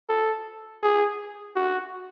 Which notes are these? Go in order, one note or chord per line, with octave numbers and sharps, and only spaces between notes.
A4
G#4
F#4